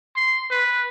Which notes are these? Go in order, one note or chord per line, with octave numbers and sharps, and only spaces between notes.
C6
B4